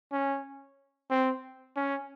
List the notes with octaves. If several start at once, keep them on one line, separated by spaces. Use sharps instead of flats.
C#4
C4
C#4